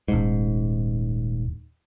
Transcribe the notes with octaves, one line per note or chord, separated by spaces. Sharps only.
D#1 G#2